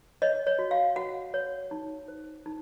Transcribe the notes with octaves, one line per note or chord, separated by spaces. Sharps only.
C#5 D#5
C#5
F#4
F5
F#4 F#5
C#5
D#4
C5
D#4